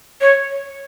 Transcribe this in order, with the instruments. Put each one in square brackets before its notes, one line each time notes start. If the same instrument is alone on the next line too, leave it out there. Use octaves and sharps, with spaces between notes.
[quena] C#5